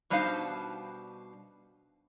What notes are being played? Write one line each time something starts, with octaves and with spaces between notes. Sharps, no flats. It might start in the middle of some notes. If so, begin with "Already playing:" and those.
B2 G3 D4 D#4 C5 F5